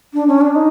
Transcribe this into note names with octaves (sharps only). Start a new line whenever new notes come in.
D4
C#4
D4
D#4